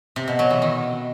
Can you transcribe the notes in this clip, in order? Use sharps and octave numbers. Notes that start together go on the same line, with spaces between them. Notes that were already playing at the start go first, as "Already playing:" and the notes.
C3
B2
F#3
E3
D#3